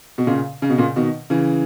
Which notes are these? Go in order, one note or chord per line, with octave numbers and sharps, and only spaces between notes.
B2
A#2 C#3
C#3
B2
A#2 C#3
B2 D#3
C#3 E3